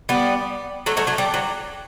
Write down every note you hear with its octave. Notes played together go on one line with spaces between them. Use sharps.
G3 B3
F#3 A3
F#3 A3
F#3 A3
G3
F#3